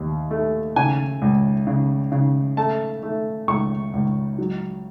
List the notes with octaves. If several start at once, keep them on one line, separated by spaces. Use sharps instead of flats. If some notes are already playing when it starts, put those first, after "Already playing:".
Already playing: D#2
A3
C#3 G#5
C#2
C#3
C#3
A3 A5
A3
C#2 C#6
C#2
F#3